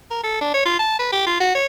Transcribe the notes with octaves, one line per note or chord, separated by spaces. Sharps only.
A#4
A4
D4
C#5
F4
A5
B4
G4
F4
F#4
C#5